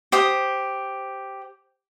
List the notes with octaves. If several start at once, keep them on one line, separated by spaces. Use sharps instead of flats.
G4 C5 D#6